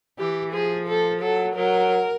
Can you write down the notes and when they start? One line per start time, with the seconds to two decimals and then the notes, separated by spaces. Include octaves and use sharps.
0.19 E3 G4
0.53 F3 G#4
0.88 A4
1.21 F#3 A4
1.55 F#3 A#4